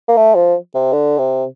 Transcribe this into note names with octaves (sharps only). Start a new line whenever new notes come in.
A#3
A3
F3
C3
D3
C3